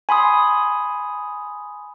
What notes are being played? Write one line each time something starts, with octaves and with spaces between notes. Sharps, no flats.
G#5 B5 C6 D#6